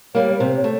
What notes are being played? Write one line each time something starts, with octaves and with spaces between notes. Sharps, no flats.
G3 A#3 C#5
C3 C5
C#5
A3